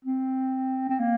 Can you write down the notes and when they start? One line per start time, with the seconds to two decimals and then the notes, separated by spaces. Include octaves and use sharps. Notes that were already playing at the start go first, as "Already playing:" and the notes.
0.05 C4
0.89 C4
1.00 A#3